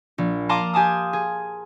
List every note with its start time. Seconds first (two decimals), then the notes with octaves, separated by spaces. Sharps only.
0.18 A#1
0.49 F5 A5 A#5 C6 D6 D#7
0.74 G4 G#5 A5 D#6
1.13 G#4